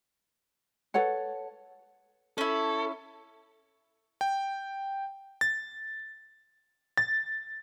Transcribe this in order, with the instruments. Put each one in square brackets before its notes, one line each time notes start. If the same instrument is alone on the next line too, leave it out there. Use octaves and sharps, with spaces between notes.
[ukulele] A4 B4 C#5 F#5
[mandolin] C#4 E4 [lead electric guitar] A4
[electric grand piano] G5
A6
A6